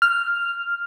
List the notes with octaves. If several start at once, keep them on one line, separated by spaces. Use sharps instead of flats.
F6